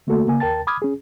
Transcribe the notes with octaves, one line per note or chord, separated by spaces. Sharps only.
D3 A3 A#3 F#4 A4
C#3 A#3 G#5
D#2 A#4 G5 A5 A6
B5 D6 D#6 F6 G#6
C#4 G#4